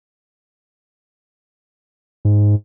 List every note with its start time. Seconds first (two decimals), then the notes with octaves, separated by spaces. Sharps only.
2.25 G#2